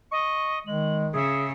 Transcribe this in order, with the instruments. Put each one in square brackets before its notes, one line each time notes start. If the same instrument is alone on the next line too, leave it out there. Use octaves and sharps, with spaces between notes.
[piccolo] D#5 [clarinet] C#6
[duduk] D#3 [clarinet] G#3 [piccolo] F#7
[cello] C#3 [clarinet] G#4 [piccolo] E5